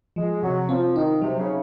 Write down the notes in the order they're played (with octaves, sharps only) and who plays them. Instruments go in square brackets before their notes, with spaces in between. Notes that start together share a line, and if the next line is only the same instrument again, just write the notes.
[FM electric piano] F3 [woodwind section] G#3
[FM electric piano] C3 [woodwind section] F#3
[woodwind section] F3 [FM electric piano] C4
[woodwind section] D#3 [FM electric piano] D#4
[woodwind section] C3 [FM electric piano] F#3
[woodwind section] C#3